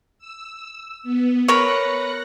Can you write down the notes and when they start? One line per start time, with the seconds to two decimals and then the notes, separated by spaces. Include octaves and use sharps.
0.18 E6
1.03 B3
1.48 A#4 B4 C#5 F#6 A#6 C#7